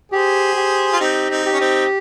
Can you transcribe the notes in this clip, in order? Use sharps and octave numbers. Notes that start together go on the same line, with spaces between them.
G4 G#4 C5
G4
F4
C4 D#4 G4
C4 D#4
G4
C#4
C4 D#4